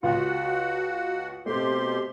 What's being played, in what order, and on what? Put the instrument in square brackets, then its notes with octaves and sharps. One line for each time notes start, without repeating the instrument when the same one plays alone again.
[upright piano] C#2 F4 [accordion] F#4 F#5
[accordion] B2 G4 C6 [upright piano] A3 C4